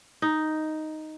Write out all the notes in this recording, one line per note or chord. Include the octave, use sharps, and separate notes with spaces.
D#4